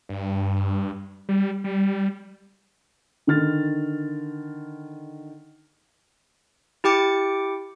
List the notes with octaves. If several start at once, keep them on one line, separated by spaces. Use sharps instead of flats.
G2
G3
G3
D3 D#3 F6 A6
E4 G4 G5 D6 C#7